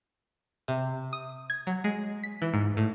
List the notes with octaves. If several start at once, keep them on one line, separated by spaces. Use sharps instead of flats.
C3
D#6
G#6
F#3
G#3
B6
E3
G#2
A2